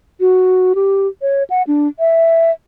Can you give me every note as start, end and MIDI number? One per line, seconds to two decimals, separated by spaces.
0.20 0.73 66
0.75 1.07 67
1.22 1.43 73
1.50 1.63 78
1.67 1.88 62
1.99 2.51 76